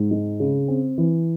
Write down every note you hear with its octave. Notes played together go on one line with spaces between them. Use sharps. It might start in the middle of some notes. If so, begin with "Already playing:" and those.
Already playing: G#2
G#3
C#3
C4
E3